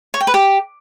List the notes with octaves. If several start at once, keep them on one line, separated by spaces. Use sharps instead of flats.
C#5
G5
B4
G4